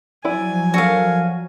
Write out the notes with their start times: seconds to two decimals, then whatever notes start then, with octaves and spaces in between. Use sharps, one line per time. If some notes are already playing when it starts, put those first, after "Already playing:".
0.25 F3 F#3 E4 D5 G#5
0.74 D4 F#4 A4 A#4 F5